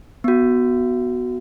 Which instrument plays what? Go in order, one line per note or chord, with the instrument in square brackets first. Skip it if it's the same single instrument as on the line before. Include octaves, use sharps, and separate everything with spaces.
[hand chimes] B3 F#4